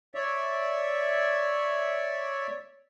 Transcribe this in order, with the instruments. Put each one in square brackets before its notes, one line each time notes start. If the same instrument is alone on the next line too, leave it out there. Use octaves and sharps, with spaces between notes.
[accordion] C#5 D5 E5